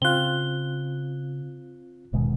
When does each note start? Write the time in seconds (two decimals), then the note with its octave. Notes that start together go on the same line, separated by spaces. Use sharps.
0.02 C#3 C4 F4 F#6 G7
2.13 D#1 E2 G#2 B2 D#3 G#3